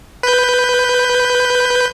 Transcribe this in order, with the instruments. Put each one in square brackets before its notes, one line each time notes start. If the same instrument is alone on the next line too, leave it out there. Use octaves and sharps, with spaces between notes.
[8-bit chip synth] B4 G6